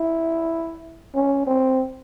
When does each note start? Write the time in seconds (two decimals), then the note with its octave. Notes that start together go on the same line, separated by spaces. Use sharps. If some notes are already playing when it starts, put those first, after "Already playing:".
Already playing: E4
1.15 C#4
1.47 C4